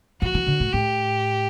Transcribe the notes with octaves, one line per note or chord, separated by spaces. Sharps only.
F3 F#4
E3
D3
A2
A2 G4